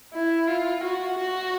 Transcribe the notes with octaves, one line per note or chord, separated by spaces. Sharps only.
E4
F4
F#4
F#4